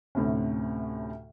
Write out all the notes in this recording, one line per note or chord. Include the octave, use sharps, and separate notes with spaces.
D2 A2 C3 C#4